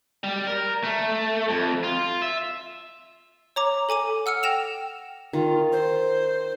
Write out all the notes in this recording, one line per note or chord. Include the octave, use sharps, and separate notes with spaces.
G3
A#4
A3
F2
F4
E5
C#5 A#5 D6
A4 G#5 D6 D#7
F#5 E6 F6 C#7
G5 A#6 E7 F7
D#3 F4
C5